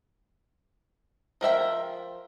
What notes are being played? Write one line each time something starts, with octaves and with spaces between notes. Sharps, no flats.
F3 A#4 E5 G5